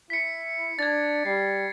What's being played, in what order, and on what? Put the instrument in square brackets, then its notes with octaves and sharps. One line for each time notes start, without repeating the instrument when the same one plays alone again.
[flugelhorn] E4 [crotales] B6 C#7
[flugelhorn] D4 [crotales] G#6 A6
[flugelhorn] G3 [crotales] C7